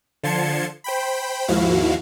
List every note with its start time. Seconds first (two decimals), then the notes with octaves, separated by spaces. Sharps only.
0.23 D3 F3 A5 C6 G#6 C#7
0.84 C5 G5 B5
1.48 D#2 G#2 F3 E4 F#4 F5